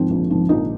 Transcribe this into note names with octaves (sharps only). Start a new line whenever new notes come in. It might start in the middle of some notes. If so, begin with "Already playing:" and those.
Already playing: G#2 F3 C4
A#1
G#2 F3 C4
A#1 D#4